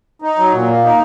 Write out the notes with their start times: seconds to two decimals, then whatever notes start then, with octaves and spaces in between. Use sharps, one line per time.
0.22 D#4
0.38 F#3
0.53 A#2
0.69 A#3
0.84 D#4